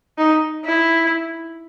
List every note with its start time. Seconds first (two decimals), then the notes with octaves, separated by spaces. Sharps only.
0.18 D#4
0.65 E4